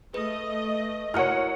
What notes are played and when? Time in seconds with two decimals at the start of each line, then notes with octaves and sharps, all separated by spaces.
0.14 A3 B4 D#5
1.14 E4 F#4 A#4 C#5 F#5 F6